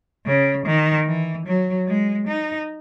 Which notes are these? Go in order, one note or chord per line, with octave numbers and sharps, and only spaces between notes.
C#3
D#3
E3
F#3
G#3
D#4